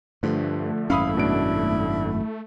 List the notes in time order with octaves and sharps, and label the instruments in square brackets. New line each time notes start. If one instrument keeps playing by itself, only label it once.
[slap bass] G2 [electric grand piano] D3 F3 [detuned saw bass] A3
[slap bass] G#1 F#2 C#4 [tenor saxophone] E4 [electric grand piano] F5 B5 D#6
[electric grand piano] B2 D4 D7